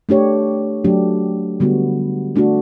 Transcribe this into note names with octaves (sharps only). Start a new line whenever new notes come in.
A3 D4 G4 C#5
F#3 A3 D4 G4
D3 G3 B3 F#4
A3 D4 F#4